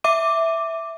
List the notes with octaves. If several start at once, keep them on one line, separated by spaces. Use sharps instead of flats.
E5 D6 D#7